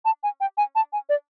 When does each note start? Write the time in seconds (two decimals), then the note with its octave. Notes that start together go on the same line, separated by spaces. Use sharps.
0.05 A5
0.23 G#5
0.40 G5
0.57 G#5
0.75 A5
0.93 G#5
1.09 D5